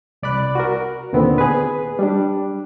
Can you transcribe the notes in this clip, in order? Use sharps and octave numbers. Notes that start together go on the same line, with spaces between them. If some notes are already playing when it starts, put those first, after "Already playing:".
C2 D5 B5 F#6
F#4 A#4
D#2 A#2 D3 B3 C4
G#4 B4
G3 D4